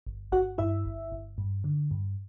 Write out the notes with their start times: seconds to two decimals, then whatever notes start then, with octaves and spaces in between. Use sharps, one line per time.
0.07 G1
0.32 G1 F#4 F#5
0.58 G2 E4 E5
0.86 G1
1.12 G1
1.38 G2
1.64 D3
1.91 G2